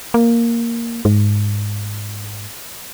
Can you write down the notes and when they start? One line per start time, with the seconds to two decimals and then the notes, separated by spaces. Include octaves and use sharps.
0.14 A#3
1.05 G#2